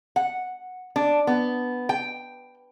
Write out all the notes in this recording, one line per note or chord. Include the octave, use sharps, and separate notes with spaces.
F#5
D4
B3
G5